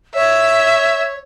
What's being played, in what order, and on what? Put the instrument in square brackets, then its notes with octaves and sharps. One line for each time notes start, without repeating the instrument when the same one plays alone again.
[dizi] C#5 [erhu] E5